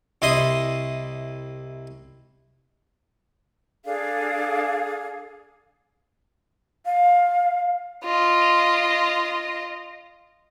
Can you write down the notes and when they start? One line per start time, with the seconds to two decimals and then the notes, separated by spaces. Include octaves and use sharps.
0.22 C2 E4 D#5 C6 D#6
3.85 D4 G#4 A4 F5
6.86 F5
8.04 F4 D#5